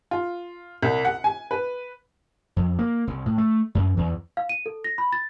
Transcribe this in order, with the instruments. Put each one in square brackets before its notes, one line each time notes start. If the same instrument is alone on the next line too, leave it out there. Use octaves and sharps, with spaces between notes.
[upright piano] F4
C2
F#5
G#5
B4
[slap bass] F2
A#3
C2
A2
A3
F#2
E2
[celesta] F5
D#7
A4
A#6
B5
A6